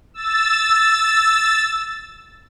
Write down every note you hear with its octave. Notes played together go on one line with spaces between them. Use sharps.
E6 A6